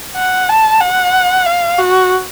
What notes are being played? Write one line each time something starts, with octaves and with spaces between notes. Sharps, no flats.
F#5
A5
F#5
F5
F#4